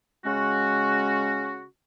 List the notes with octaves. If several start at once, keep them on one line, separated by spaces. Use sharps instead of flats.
C#3 G#3 C#4 F#4